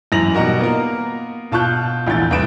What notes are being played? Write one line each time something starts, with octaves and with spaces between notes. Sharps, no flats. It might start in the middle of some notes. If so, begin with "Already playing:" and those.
F#2 E3 A#6 F7 F#7
B2 G3 D#4 F#4 A#4
A#3 B3 F4 A#4
B2 F4 A5 C#6 F#6 G6
A#1 E2 A2 G6 A6
C2 A2 B4 D7 E7